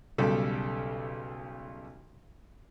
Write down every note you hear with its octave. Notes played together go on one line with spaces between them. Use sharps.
B1 C#3 G3 A4